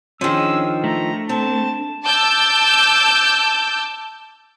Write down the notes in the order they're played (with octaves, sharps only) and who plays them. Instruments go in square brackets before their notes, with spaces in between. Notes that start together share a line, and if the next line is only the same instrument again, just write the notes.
[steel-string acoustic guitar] D#3 F3 [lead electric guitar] C#4 G#4 [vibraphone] D4 [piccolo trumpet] E6
[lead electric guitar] A3 [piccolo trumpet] A#5
[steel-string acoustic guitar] C4 [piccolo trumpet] A5
[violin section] A5 D6 E6 G6